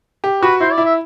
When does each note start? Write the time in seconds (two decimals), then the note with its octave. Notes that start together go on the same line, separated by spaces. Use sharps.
0.24 G4
0.42 F#4 B4
0.60 E4 C5
0.72 D5
0.78 E4
0.85 E5